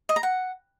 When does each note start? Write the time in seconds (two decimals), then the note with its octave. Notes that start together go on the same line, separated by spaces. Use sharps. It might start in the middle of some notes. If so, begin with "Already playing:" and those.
0.09 D#5
0.16 A#5
0.23 F#5